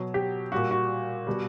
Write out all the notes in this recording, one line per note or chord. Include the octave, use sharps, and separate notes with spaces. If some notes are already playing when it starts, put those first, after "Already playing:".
Already playing: B2 F#3
G4
A#2 G3 F#4
F#4
B2 G3